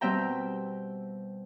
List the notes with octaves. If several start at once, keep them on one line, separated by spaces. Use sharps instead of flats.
B2 G3 C4 E5 G5 A#5